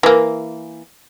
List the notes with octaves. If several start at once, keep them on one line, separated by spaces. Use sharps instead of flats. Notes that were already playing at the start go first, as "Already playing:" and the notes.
E3 A#3